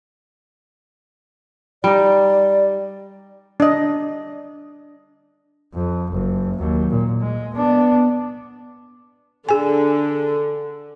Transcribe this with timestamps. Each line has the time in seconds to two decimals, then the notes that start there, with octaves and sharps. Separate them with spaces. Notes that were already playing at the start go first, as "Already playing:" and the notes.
1.84 G3 D#4 D5
3.60 D4 D#5
5.74 F2
6.12 F#1
6.59 D#2 F#3
6.90 A#2
7.21 G#3
7.54 B3 D4
9.49 D3 G#4 G#5